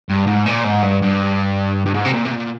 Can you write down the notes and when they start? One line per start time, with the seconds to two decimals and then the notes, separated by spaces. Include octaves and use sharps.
0.09 G2
0.27 G#2
0.46 A#2
0.64 G#2
0.83 G2
1.02 G2
1.86 G2
1.94 G#2
2.05 C3
2.13 A#2
2.25 C3
2.32 A#2